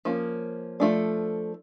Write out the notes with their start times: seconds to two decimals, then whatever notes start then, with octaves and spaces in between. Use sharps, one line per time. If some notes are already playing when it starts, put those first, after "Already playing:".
0.05 F3 A#3 C#4
0.80 F3 A3 D4